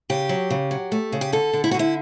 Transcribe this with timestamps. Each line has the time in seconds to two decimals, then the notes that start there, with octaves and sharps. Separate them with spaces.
0.10 C#3 G4
0.29 F#3
0.50 C#3
0.71 F#3
0.92 A3
1.12 C#3
1.21 G4
1.32 D3 A4
1.53 D3
1.64 E4
1.71 F#4
1.74 D3
1.79 E4